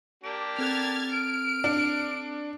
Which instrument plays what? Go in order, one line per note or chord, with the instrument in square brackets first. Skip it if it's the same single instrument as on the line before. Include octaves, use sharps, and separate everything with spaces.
[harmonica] A#3 D4 G4 [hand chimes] D7
[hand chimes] C4 A4 F#6 [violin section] F6 G#6 A6
[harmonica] F6 [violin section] D7
[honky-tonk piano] D4